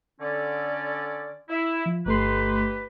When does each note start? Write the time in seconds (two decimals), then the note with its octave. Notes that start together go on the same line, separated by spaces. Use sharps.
0.20 D3 C#4 D5
1.49 E4
1.86 F3
2.06 G1 A3 D#4 G4 B4 C6